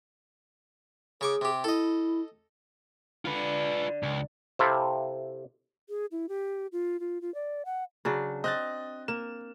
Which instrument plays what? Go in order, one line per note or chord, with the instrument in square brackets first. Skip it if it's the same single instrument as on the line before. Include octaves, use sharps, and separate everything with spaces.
[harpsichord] C#3 C#6 D6 [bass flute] G#4
[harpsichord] C3 G4
[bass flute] E4 [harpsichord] A4 D#5
[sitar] D3 [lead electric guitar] F4 B4
[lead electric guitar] C#2
[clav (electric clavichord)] C3 C4 E4 A4 E5 F5
[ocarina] G#4
E4
G4
F4
F4
F4
D5
F#5
[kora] C#3 F#3 D4
[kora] C4 [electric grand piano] D#5 F#6 A6
[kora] A#3 [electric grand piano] E7